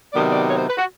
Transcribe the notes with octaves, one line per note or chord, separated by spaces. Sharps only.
C3 D#3 F#3 B3 D5
D5
C#5
C5
B4
F#4